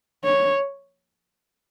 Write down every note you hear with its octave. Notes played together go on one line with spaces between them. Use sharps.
C#5